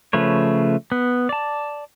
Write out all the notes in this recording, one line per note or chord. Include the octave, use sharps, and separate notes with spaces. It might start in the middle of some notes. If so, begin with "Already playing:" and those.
C#3 F3 A3 B4 C#5
B3
D5 A5